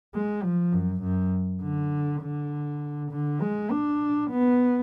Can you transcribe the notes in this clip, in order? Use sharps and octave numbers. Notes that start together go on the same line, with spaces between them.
G#3
F3
F#2
F#2
D3
D3
D3
G#3
D4
B3